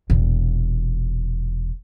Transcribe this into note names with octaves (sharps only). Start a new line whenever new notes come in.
E1 A#2